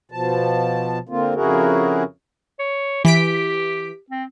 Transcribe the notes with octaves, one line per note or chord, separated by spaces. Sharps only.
B2 F3 A5
D3 A#3 C4 F4
F2 C#3 E4 F#4 G#4 A#4
C#5
E3 G4 B6 D7
C4